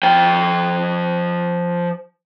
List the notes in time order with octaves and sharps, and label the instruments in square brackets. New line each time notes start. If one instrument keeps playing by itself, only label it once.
[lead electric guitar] F3 G5